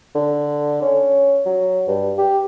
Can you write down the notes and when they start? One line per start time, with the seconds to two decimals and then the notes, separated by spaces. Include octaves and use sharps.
0.15 D3
0.82 C#4
1.46 F#3
1.87 G2
2.18 G4